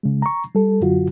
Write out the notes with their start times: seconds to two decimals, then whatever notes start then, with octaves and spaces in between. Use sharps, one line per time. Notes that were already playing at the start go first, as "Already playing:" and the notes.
0.03 C#3 G#3
0.22 A#5 C#6
0.55 G3 A4
0.81 F#2 D3 F#3 F4 F#4